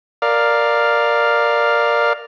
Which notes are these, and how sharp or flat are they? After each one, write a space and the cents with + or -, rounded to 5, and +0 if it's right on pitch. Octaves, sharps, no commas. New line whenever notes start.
A#4 +0 D5 +5 F5 +0